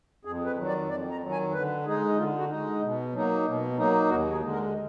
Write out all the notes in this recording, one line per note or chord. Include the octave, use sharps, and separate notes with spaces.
F2 G#4
B4
D#3 F#3
D5
F2 D5
A#5
D#3 F#3
G#5
D3 B4
G#3 D#4 G#4
D3 F4
F#4
G#3 D#4
B2
F#3 A#3 D#4
B2
F#3 A#3 D#4
D#2 F#4
G#4
D3 G#3
A#4